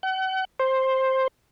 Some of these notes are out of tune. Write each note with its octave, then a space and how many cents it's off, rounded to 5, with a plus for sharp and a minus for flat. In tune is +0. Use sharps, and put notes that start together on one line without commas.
F#5 +40
C5 +10